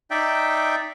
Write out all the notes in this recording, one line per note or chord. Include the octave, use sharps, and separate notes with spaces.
D#4 D5 E5 G5